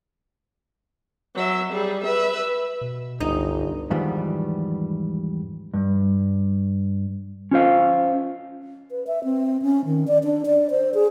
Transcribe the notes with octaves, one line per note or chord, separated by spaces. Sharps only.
F#3 E5
G3 G#4
B4 E5
B2
G1 C#2 D#4
E2 G#2 D#3 F3 G3 B3
G2
C#4 F4 C5 F5
B4
E5
C4
C#4
D#3
D5
D4
D5
C5
G#4